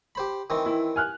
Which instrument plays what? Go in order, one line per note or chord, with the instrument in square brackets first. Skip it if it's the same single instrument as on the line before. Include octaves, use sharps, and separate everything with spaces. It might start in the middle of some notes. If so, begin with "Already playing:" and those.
[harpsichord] G4 C5 B5
D#3 E3 C4
[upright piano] E4
G#5 F6 F#6